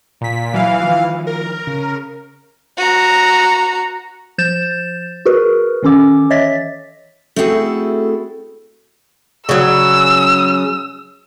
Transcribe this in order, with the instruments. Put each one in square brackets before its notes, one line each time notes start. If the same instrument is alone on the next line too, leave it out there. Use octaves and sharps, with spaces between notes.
[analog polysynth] A#2 B6
[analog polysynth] E3 F5 [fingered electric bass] F#3
[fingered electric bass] D#3 F3
[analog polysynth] A#4
[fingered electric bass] C#3
[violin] F#4 A#5
[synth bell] F3 G6 A6 E7
F#4 G#4 A#4 B4
D#3 E3 C#4 A4 D6
C#5 D#5 E5 A6 B6
[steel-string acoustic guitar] A3 C4 E4 F#4 G#4 A4
[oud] C#3 F#3 [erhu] E6